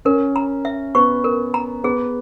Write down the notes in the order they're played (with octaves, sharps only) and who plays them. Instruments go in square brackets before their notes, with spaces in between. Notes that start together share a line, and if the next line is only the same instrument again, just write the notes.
[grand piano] C#4 [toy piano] A#4
[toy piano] A#5
E5
[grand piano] B3 [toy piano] C#6
[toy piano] A#4
A#5
[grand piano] B3 [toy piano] G#4